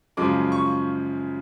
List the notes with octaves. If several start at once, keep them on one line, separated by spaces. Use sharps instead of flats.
F#2 C#3 F3 G#3 D6
C#6